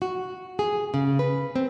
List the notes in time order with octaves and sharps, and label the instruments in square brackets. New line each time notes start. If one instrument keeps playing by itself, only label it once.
[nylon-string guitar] F#4
G#4
C#3
B4
C4